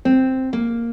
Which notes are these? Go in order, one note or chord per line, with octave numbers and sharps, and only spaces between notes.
C4
A#3